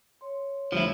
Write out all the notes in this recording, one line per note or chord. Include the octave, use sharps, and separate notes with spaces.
C#5 C6
F1 D2 F3 G3 E4